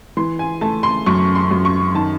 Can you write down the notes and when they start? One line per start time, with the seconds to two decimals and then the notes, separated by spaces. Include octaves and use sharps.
0.17 E3 C6
0.39 G#5
0.61 A3 A5
0.83 C6
1.06 F#2 C#6
1.35 C6
1.51 F#2
1.65 C#6
1.95 D#3 A5